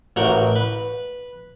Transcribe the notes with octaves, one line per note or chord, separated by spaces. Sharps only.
A1 F#4 A#4 G5
B4